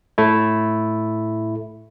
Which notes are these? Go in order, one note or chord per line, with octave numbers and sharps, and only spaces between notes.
A2 A3 E4